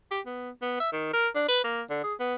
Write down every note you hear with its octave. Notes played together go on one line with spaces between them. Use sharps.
G4
B3
B3
E5
D#3
A#4
D4
B4
A#3
D3
G#4
B3